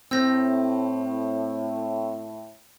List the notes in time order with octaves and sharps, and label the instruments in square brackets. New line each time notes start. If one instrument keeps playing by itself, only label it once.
[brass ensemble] A2 [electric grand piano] C4 [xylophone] E6 G6 A#6